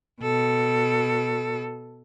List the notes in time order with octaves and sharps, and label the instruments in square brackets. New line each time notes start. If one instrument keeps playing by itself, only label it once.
[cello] B2 A4